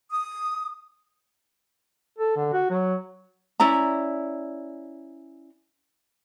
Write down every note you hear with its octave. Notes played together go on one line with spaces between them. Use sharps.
D#6
A4
D3
F#4
F#3
C#4 E4 D5 A#5